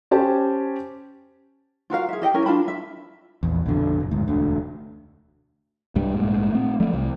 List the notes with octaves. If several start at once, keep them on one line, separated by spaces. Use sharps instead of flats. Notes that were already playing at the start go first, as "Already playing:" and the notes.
C#4 G4 C5 G#5 A5
F4 F#4 A#4 F5
G#4 E5
G4 D#5 F#5 G5
C#4 E4 A#4
D4 F4 A5 B5
E5
A#1 E2
A#1 F2 B2 D3
F#1
D2 G#2
E1 D2 D3
C2 G2 G3
A#1 G#2
A3 C4
F3 G3 A3
C2